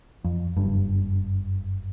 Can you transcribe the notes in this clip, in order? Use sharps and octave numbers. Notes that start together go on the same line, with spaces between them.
F2
F#1 G2